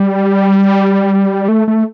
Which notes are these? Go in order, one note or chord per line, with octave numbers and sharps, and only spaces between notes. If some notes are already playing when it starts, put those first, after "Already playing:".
Already playing: G3
A3
A3